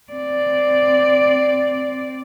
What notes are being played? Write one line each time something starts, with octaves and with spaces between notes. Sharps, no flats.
C4 D5